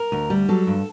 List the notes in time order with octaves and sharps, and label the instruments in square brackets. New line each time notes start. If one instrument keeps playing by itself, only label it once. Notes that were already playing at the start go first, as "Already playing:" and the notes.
Already playing: [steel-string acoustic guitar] A#4
D2
G3
F#3 A4
G2